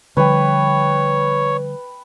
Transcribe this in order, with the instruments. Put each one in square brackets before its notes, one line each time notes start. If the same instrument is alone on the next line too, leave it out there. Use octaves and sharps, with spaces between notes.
[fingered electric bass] D3 F3 G3 [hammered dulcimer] B4 G5 [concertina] C#5